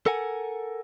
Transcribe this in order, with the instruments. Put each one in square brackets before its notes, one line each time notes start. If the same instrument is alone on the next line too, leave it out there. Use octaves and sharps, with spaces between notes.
[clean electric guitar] A4 A#4 F#5 G#5